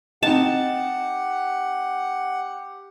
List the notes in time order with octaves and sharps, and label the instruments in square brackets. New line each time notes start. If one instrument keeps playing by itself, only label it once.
[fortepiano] C4 D#4 D#5 [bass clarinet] G4 [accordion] F#5 [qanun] A5